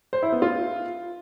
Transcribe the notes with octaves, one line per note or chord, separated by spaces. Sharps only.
C5
E4
B3
F4